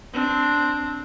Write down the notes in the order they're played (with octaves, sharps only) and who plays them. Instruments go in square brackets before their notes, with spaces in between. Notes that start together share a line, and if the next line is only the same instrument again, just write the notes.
[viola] C4 D4